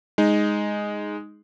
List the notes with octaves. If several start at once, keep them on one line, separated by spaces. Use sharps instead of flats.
G#3 D#4